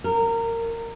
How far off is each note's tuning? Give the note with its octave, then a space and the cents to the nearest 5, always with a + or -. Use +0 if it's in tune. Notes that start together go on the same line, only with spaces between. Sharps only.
A#4 -20